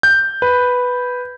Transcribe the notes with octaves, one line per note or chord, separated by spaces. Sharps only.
G6
B4